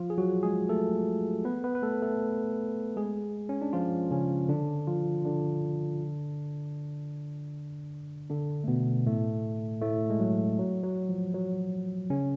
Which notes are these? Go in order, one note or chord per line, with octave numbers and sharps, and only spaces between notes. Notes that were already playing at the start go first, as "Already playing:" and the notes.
Already playing: F3 F4
G#4
F#3 F#4
G#3 G#4
A3 A4
B3 B4
B3 B4
B4
A3 A4
A3 A4
G#3 G#4
C#4
D4
F3 F4
C#3 C#4
D3 D4
F3 F4
D3 D4
D3 D4
A3
B2 B3
A2 A3
A2 A3
G#3
F#3
F#3
F#3
F3
F#3
C#3 C#4